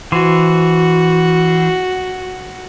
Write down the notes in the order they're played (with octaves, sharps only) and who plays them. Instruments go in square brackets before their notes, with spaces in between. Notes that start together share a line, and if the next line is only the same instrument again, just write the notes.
[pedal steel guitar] E3 C5 [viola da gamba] F#4